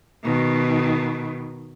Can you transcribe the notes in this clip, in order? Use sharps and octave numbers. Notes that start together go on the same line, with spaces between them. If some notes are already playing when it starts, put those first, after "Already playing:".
B2 D#3